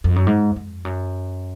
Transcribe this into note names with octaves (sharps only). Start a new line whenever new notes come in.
F2
F#2
G#2
F2
F#2